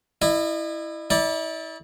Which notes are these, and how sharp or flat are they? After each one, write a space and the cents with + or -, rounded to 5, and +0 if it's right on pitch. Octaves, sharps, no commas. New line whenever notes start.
E4 +0 D#5 -40
E4 -35 D5 +0